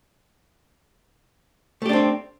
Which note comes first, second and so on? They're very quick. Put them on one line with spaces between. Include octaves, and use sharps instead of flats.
A3 G4 D4 C4